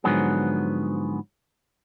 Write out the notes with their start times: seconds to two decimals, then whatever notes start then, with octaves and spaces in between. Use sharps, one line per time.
0.04 G#2 D3 F3 F#3 B3 G#4